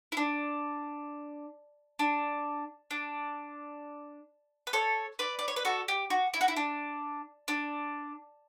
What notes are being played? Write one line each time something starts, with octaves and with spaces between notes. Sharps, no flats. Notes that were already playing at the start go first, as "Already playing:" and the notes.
E4
D4
D4
D4
B4
A4 C#5
B4 D5
D5
C#5
B4
F#4 A4
G4
F#4
E4
F#4
E4
D4
D4